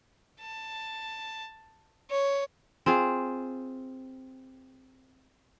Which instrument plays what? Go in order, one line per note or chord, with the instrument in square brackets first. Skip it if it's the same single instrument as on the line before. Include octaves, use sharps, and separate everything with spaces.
[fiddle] A5
C#5
[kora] C4 F4 G#4